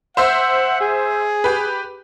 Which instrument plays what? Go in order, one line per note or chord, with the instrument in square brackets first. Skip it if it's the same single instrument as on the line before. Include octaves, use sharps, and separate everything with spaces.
[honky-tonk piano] C5 E5 C6 [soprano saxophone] F#5
[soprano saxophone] G#4
[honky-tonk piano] G4 B4